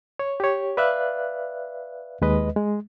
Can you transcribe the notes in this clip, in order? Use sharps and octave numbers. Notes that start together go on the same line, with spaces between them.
C#5
G4 C#5
B4 D5 E5 F5 F#6
D#2 G#3 B4 D#5
G#3